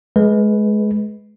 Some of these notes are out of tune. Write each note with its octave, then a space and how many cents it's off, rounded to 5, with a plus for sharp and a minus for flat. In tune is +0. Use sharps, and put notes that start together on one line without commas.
G#3 +25 B4 +0